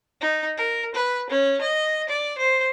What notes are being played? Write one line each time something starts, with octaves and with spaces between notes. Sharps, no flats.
D#4
A#4
B4
C#4
D#5
D5
C5